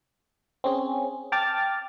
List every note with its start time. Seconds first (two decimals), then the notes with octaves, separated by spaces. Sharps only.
0.64 C4 C#4 G#4
1.32 G5 A5 D6 F6 A6